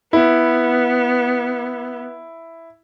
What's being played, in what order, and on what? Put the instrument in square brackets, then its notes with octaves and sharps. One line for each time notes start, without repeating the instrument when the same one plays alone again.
[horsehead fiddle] B3 [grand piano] E4